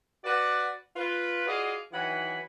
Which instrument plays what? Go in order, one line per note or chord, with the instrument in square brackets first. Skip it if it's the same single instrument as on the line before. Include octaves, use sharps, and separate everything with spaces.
[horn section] F#4 B4 D5
F4 B4
F4 F#4 G#4 D5 D#5 F5
D#3 E3 F#3 F#5 G#5 B5